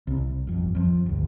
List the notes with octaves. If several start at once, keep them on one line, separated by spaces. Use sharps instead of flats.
C2
G1 F2
F2 F3
G1 D2